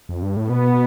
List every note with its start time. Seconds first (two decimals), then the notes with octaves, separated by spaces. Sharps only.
0.09 F2
0.22 G2
0.36 A2
0.50 B2 B3